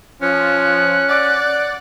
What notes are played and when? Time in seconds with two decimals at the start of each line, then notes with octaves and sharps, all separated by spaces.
0.22 F3 C#4 F#6
1.09 D5 F#5